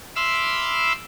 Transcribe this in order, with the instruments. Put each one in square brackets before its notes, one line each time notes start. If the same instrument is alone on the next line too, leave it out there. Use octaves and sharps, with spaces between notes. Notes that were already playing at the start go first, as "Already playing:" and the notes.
[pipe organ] E5 B5 C6 D6 E6 F6